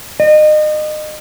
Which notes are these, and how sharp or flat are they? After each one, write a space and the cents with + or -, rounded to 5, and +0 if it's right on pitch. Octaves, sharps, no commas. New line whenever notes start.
D#5 -30